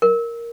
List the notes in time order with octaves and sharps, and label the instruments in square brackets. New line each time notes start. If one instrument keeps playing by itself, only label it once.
[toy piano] A#4